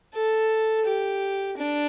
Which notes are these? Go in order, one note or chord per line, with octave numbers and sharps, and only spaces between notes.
A4
G4
D4